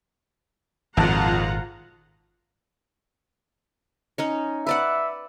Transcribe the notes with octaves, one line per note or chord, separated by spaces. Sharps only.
G#1 F2 A#2 F4 F#5 A5 A#5
C#4 D#4 C#5
B4 D5 E5 F#5